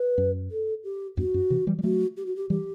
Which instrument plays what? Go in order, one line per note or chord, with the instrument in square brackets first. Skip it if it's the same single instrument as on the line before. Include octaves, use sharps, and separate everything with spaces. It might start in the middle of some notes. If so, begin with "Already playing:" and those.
Already playing: [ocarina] B4
[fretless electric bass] F#2
[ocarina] A4
G4
[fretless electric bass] E2 G2 [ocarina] F#4
[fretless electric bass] F#2
C3 E3
E3 G3
G3
[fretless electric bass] F#3 A3 [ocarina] F#4
[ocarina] G4
F#4
G4
[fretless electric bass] E3 G3 [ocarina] G4